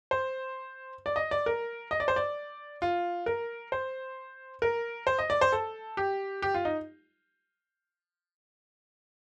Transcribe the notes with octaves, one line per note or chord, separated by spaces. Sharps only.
C5
D5
D#5
D5
A#4
D#5
D5
C5
D5
F4
A#4
C5
A#4
C5
D#5
D5
C5
A4
G4
G4
F4
D#4